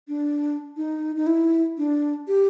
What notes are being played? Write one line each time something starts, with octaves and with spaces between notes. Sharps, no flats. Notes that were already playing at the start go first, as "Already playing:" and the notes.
D4
D#4
D#4
E4
D4
G4